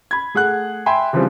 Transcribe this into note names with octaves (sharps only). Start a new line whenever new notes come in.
B5 G#6
A3 G#4 F#5 F#6
E5 G5 G#5 B5 C6
C#3 E3 F3 G3 C4